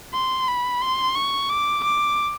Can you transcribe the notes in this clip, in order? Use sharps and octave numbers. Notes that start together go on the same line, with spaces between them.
C6
B5
C6
C#6
D6
D6